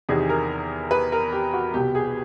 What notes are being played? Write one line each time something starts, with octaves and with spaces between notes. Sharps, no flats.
E2 C3 D#3 G#4
A#4
B4
A#4
G4
F#4
C2 B2 G4
G#4